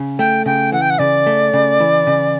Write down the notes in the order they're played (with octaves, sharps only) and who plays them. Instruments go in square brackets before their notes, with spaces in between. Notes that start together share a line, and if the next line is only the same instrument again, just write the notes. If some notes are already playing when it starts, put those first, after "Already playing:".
Already playing: [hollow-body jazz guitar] C#3
[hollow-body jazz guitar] A3 [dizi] G5
[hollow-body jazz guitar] C#3 [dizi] G5
[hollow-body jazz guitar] E3 [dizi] F#5
[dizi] G5
F#5
[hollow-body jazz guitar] C#3 [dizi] D5
[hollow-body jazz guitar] A3
C#3
E3
C#3